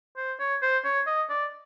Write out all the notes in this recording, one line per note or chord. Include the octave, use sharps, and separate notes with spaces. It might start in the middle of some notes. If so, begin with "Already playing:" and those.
C5
C#5
C5
C#5
D#5
D5